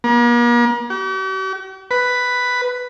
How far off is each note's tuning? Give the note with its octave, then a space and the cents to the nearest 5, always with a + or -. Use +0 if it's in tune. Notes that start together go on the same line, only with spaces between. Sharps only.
A#3 +45
G4 -45
B4 +5